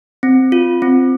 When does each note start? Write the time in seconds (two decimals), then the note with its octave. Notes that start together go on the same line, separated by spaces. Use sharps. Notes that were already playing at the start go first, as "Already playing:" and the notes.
0.23 C4
0.52 F4
0.82 C4